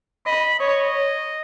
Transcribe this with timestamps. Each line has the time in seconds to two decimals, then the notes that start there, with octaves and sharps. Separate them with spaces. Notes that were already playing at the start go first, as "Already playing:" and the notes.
0.25 D#5 B5
0.60 C#5 D#5